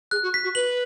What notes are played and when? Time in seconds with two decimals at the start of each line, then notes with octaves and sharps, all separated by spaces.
0.11 G#4 F#6
0.23 F#4
0.34 B6
0.44 F#4
0.55 B4 F#7